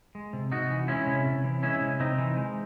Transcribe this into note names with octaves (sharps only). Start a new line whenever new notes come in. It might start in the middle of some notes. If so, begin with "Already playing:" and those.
G#3
C3
C3 D#4 F#4
E3
G#3 C#4 E4
C3
C3
E3
G#3 C#4 E4
C3
C3 C4 D#4
E3
G#3